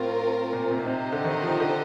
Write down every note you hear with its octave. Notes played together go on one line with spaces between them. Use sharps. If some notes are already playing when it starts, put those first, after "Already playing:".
Already playing: A2 C4 F4 A#4
A#2
C3
A#2
C3 D#4 G4 C5 D#5
D3
D#3
F3
D3